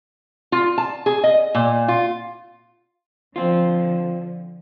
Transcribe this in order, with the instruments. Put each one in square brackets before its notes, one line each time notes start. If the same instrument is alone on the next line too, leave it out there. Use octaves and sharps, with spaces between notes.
[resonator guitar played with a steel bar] F4
A5
G#4
D#5
A#2
F4
[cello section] D3 F3 [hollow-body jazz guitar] C4 F4